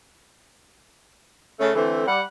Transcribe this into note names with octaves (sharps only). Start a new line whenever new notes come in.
C#3 A3
D3 E3 A3 C4
G3 F#5